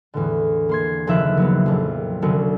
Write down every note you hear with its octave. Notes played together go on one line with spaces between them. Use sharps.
E2 A2 D3
A#3 C6 G#6
F#1 D#2 C#3 F3 E5 F#6
F#3 A#3 B3
A#1 F2
C2 D3 F#3 C#4